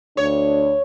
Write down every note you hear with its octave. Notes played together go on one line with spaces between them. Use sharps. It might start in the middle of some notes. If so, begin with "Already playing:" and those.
D2 D4 C#5